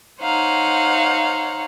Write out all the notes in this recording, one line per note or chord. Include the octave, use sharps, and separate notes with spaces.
D#4 C5 C#5 F5 F#5 A#5